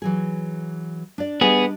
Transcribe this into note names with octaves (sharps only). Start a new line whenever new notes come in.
E3 F#3 G#4
D4 D5
G3 B3 D4 G#4 D#5